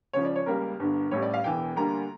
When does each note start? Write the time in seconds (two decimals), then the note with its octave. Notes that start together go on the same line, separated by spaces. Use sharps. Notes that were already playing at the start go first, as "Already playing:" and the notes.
0.13 C#2 C#3 F3 C#5
0.25 D5
0.36 C#5
0.46 C#2 C#3 G3 A#3 A#4
0.79 G1 G2 D3
1.11 A1 A2 G3 C#5
1.22 D5
1.34 F5
1.44 E1 E2 E3 G5
1.76 D2 D3 G3 A#3 A#5